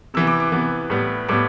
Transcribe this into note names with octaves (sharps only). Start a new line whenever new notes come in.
C3 E3 B3 E6
D6
D6
C3 E3 B3
A2 G3 B3
A2 G3 B3 D6